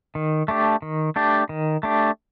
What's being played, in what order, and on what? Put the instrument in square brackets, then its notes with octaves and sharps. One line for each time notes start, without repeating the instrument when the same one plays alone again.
[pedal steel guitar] D#3
A3 D4 G4
D#3
A3 D4 G4
D#3
A3 D4 G4